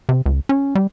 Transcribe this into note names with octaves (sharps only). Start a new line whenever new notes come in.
C3
C#2
C#4
G3